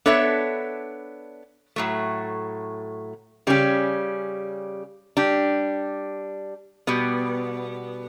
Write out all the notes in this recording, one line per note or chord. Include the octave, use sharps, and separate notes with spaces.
B3 D4 A4 C#5 E5
A2 F#3 A3
C#3 G3 C#4 G4
G3 D4 G4
B2 G3 B3